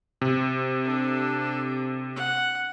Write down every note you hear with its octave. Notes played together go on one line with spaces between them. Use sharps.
C3
D4 A4
F#5